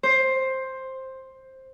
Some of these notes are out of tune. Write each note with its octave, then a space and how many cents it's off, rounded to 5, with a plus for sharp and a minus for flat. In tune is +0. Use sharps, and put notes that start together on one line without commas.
C5 +10